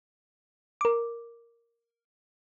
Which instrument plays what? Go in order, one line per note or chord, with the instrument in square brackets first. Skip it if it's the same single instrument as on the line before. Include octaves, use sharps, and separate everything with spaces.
[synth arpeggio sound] A#4 D6